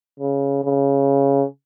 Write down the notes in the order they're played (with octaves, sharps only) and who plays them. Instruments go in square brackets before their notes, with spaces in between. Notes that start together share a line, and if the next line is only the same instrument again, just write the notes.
[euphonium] C#3
C#3